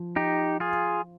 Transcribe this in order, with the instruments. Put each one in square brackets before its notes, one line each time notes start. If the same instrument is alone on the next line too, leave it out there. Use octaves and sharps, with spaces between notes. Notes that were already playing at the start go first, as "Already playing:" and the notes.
Already playing: [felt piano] F3
[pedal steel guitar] D#4 G4
F4 G#4